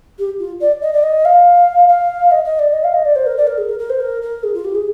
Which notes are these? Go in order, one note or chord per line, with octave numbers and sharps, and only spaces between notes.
G4
F4
D5
D#5
D5
D#5
F5
F5
D#5
D#5
D5
D#5
F5
D#5
D5
C5
A#4
D5
A#4
G#4
A#4
A#4
C5
A#4
A#4
G#4
F4
G4
G#4